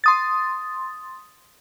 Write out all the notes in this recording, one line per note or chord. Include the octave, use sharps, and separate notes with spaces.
C6 D#6 A6